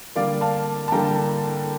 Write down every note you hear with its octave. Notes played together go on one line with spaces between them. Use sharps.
D3 G3 A#3 D5 F5
F5 A5
A5
D3 G3 A#3 G5 A#5